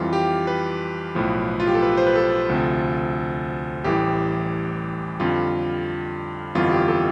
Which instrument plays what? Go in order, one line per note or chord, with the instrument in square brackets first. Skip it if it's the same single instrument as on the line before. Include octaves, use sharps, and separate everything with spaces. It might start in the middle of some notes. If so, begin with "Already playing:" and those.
Already playing: [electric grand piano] F2 E3 G3 F4
G4
B4
B1 A2 F3
F4
G4
A4
B4
C5
B4
A4
D2 C3 F3
A1 A2 E3 G3 G4
F2 D3 G3 F4
G1 F2 E3 G3 F4
G4
A4